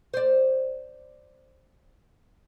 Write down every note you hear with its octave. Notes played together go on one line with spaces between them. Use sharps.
C5 D5